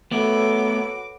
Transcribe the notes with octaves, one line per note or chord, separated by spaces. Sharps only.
A3 B3 F#4 A4 B4 C#5 D6